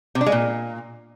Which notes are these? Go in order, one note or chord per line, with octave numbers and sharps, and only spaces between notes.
C3
D4
G#3
A#2